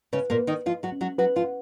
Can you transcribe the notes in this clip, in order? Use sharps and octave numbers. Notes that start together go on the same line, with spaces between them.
C#3 C#4 B4
A#2 A#3
B4
D#3 D#4
F3 F4 D#5
F#3 F#4
C#4
F#3 F#4
F#3 F#4 B4
F3 F4
F#5